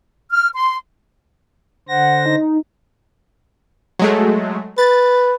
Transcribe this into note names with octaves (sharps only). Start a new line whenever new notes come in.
F6
C6
D3 C5 F#5 A#6
D#4
F#3 G#3 A3
B4 A6